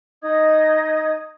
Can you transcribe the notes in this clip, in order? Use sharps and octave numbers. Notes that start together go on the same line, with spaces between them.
D#4 D#5 D#6 G#6